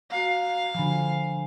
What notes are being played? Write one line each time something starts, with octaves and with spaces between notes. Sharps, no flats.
F#4 F5 A#5
D3 F3 G#5 B5